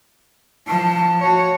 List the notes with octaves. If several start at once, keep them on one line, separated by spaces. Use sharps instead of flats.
F3 A5
F#4 C#5